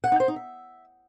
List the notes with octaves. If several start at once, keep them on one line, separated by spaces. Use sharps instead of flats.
F#5
D#4
C5
D#4
E5